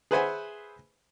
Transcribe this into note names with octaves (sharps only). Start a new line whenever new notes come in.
G#4 B4 C5 E5 F#5 G#5